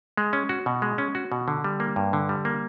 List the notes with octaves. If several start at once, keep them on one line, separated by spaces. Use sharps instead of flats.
G#3
C#4
F#4
B2
G#3
C#4
F#4
B2
D3
G3
A#3
G2
D3
G3
A#3